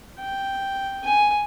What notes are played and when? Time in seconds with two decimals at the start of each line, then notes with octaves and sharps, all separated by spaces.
0.20 G5
1.04 G#5